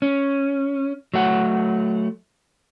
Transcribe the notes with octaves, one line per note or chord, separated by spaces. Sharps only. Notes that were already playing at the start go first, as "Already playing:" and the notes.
C#4
F#3 A3 F#5